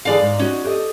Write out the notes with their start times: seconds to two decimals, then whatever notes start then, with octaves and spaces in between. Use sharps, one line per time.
0.05 D3 E3 G#4 D5 F5
0.21 G#2 D#4
0.39 C#4 D#4 F#4
0.65 G4 A4 D#5